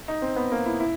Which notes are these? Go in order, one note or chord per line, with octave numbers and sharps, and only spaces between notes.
D#4
C4
B3
A#3
E4
E4